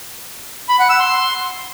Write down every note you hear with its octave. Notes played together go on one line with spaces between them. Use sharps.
B5
F#5
E6
C6